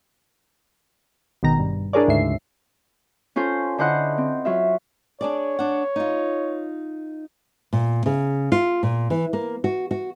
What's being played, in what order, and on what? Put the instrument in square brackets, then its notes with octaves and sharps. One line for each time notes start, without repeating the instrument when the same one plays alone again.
[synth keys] G#1 B2 D#3 A#5
G2
D4 E4 G#4 A#4 C#5 D5
D2 G#2 C#3 E5 C7
[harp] C#4 F4 A4 C5
D3 E4 C5 D#5 F#5 F#6
C4
F#3 F4 E5
[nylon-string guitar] D4 G#4 D5 [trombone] C#5
[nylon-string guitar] D4 F#5
D#4 F4
A#2
C#3
F4
A#2
E3
A#3
F#4
F#4